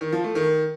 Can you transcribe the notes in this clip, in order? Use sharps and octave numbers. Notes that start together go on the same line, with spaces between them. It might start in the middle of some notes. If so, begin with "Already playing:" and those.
D#3
F3
A3
D#3